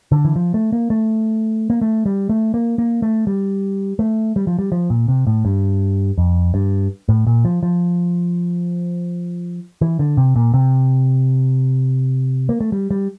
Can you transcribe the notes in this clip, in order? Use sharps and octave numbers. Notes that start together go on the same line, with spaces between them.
D3
E3
F3
A3
A#3
A3
A#3
A3
G3
A3
A#3
A#3
A3
G3
A3
G3
F3
G3
F3
A#2
C3
A2
G2
F2
G2
A2
A#2
F3
F3
E3
D3
C3
A#2
C3
A#3
A3
G3
G3